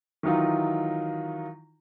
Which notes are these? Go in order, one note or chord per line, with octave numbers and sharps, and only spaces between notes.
D#3 E3 F#3 D#4 F4